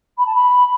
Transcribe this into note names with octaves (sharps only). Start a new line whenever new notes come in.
B5
A5
B5